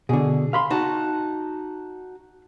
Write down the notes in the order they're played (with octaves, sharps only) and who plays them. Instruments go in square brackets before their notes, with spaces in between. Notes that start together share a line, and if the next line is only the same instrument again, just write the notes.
[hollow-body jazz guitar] B2 D3 [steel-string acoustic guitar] G#4
[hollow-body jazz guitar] F5 B5 C6
[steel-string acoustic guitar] D#4 F#4 A5